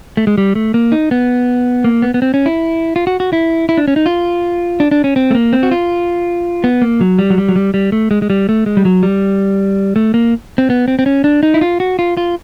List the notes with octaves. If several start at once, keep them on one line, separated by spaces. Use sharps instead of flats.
A3
G#3
G3
A3
A#3
D#4
B3
A#3
B3
B3
C4
C#4
E4
F4
F#4
F#4
E4
E4
D4
C#4
D#4
F4
D4
D4
C#4
C4
A3
A#3
C4
F#4
F4
B3
A#3
F#3
G3
F#3
G3
F#3
G3
G3
A3
G#3
G#3
G3
A3
G#3
G3
F#3
G3
A3
A#3
C4
B3
C4
C4
C#4
D4
D#4
E4
F4
F#4
F4
F4